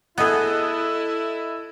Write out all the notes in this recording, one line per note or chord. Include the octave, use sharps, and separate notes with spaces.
B3 E4 G#4 A4 D#5 F#6